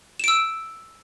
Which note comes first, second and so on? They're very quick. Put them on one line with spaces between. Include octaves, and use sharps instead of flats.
E7 D7 E6